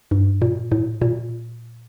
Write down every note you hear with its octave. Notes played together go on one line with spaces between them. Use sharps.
G2
A#2
A2
A#2